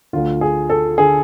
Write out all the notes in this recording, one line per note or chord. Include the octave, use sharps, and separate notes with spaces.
D2 D3 F4
G#4
A4
D3 G#4